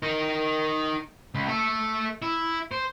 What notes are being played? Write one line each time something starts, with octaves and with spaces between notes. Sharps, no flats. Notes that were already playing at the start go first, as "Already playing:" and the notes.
D#4 A#4
C#2
A4 E5
E4
C5